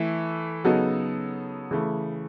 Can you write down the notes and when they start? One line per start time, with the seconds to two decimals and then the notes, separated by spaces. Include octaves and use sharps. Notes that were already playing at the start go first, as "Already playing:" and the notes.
Already playing: E3 A3 E4
0.64 C#3 F#3 B3 D#4 A4
1.71 C#3 E3 A3